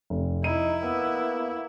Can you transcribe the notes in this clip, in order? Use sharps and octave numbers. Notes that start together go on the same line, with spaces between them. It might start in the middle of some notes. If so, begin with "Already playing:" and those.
F1
D#4 E4 D#7
A#3 B3 E6